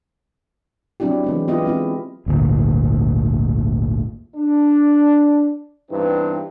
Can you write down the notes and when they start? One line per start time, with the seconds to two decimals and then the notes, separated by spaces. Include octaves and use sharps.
1.00 F#3 C4 D4 E4 G4
1.24 E3 G#3 B3
1.48 B3 E4 F4 G4 D#5
1.65 G#3 C4 E4
2.26 G#1 D2 A#2
4.36 D4
5.91 E2 G2 E3 B3 C4 D#4